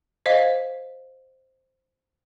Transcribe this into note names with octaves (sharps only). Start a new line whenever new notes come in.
C5 D#5 F5